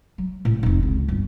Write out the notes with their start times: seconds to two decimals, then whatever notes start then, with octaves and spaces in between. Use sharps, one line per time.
0.18 F#3
0.45 A2 C3
0.63 F1 D#4
0.80 C#2 C4
1.08 G1 G3